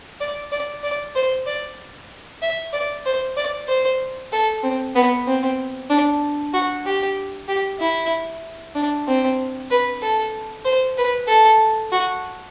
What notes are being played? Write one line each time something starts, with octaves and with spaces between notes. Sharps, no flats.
D5
D5
D5
C5
D5
E5
D5
C5
D5
C5
A4
C4
B3
C4
D4
F#4
G4
G4
E4
D4
C4
B4
A4
C5
B4
A4
F#4